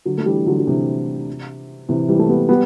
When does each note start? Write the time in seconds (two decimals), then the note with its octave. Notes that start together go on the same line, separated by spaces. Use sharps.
0.05 D3 F#3
0.18 A3
0.26 E3 G3
0.46 D3 F#3
0.59 F#3
0.67 C3 E3
1.89 C3 E3
2.08 E3 G3
2.19 A3
2.29 G3 B3
2.49 G3 B3